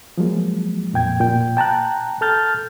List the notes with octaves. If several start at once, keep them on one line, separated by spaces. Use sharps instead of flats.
F3 F#3 G#3 A#3
F2 A#2 G5 G#6
A#2 G5
G5 A5 A#5 F#6
A4 A5 F6 G6 A6